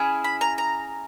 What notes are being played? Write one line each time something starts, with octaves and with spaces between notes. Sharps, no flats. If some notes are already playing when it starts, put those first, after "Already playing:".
Already playing: C#4 E4 G#4
B5
A#5
A#5